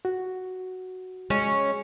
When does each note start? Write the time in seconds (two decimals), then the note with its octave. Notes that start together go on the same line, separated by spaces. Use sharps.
0.05 F#4
1.30 G#3 C#4